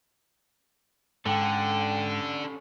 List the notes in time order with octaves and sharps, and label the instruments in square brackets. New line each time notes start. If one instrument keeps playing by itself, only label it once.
[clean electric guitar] G#2 [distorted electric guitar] D3 [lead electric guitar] C#4 A4 [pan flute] G5